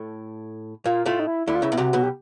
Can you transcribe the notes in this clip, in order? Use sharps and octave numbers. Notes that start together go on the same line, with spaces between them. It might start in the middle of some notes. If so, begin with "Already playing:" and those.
Already playing: A2 A3
A#2 A#3 F4
A2 A3 F4
D#4
E4
D2 D3 E4
F4
C#2 C#3 E4
B2
C2 C3 F#4
B1 B2
G4